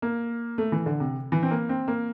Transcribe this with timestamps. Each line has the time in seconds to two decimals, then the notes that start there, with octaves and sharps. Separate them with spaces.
0.02 A#3
0.58 A3
0.72 E3
0.86 D3
1.00 C3
1.32 E3
1.43 C4
1.51 A#3
1.69 C4
1.88 A#3